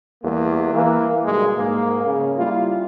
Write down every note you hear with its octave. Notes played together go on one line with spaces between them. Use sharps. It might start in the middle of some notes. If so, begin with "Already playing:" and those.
E2 G3 A#3
E3 A#3
B1 G2 B2 D3 G#3
G#2 A#3
C#3
G3 A#3 E4 F4